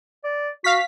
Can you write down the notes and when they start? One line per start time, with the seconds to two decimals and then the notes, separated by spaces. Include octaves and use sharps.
0.24 D5
0.64 F#4 F5 B6